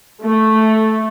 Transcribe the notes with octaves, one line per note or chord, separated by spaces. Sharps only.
A3